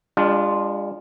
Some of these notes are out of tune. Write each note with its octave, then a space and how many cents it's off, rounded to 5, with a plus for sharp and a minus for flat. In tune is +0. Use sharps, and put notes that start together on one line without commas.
G#3 -40 D4 +0 F4 +0